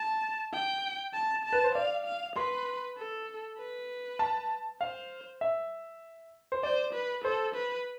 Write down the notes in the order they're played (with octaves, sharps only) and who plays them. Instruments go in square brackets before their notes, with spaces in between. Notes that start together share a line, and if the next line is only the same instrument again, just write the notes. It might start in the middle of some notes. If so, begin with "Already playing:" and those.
Already playing: [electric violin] A5
G5
A5
A5
[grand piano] B4
C5
[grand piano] D5 [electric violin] F5
[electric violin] F5
[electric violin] B4 [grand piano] C6
[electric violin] A4
B4
[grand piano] A5
[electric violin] C5 [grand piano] F5
[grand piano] E5
C5
[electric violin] C5 [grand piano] D5
[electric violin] B4
[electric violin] A4 [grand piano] C5
[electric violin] B4